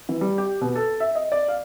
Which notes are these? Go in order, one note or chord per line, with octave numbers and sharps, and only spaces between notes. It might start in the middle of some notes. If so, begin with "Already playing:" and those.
E3
G3
G4
B2
A4
E5
D#5
D5
F5